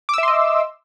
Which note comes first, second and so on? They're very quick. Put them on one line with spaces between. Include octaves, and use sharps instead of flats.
D6 E6 E5 C6 D#5